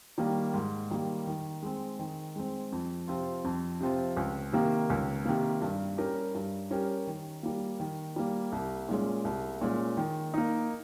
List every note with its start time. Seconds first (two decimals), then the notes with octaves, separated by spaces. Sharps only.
0.18 D#3 G3 A#3
0.54 G#2
0.90 D#3 G3 A#3
1.27 D#3
1.63 G#3 C4
1.99 D#3
2.36 G#3 C4
2.72 F2
3.07 C3 F3 C4 F4
3.45 F2
3.80 C3 F3 C4 F4
4.17 C#2
4.53 C3 D#3 A#3
4.90 C#2
5.25 C3 D#3 A#3
5.62 G2
5.98 G3 C#4 G4 A#4
6.35 G2
6.70 G3 C#4 G4 A#4
7.07 D#3
7.43 G3 A#3
7.80 D#3
8.16 G3 A#3
8.52 C2
8.89 A#2 G#3 C#4
9.25 C2
9.61 A#2 G#3 C#4
9.97 D#3
10.34 A#3 D#4